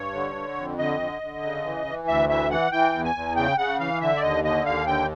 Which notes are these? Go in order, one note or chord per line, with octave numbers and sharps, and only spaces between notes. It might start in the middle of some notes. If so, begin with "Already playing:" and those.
Already playing: G2 C#5
D3
D3
F2
D3 D#5
D3
D3
C#3
E3
E3
D2 E5
E3 E5
E3 F#5
E3 G5
E2
G#5
E2
C#3 G5
C#3 F#5
E3 F5
D3 E5
D5
D#2 D#5
D3 D#5
D#2 F5
D3 G5